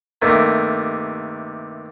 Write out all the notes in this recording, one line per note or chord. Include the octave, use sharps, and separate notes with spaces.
G2 C3 D#3 A3 A#3